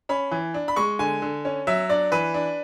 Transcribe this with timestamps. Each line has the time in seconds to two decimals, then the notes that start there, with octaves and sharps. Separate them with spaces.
0.09 C#4 B5
0.31 E3
0.54 D4
0.68 B5
0.76 G#3 C#6
0.99 D3 G#5
1.22 D3
1.45 C#4
1.67 F#3 E5
1.90 D4 D5
2.12 E3 B4
2.34 D4